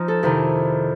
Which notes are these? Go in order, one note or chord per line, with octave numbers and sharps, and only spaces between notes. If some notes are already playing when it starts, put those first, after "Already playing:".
Already playing: F3 D#4
A4
F2 C3 D#3 E4